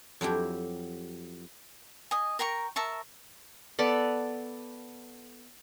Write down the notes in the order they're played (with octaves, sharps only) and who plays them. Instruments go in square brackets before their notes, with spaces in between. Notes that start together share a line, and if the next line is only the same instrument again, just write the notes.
[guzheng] F2 F#3 E4 G4
[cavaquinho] D#5 G#5
A#4 G5 A#5 C#6
A#4 E5 A5 C#6
[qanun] B3 A4 D5